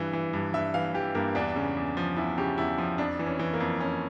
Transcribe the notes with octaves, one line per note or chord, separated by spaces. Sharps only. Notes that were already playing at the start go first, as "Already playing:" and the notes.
Already playing: G2 E3
E3
G2
G2 E5
E3 F5
E3 G4
G2 A#3
E2 D4
C#3
E2
F3
E2 E4
C#3 G4
E2 E4
F3
F2 D4
E3
C#4
E3
A#3
F2
F2 C#4